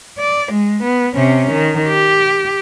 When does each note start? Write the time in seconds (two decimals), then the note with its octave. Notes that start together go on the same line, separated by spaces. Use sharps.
0.18 D5
0.52 G#3
0.84 B3
1.15 C3 C#4
1.52 D#3
1.87 G4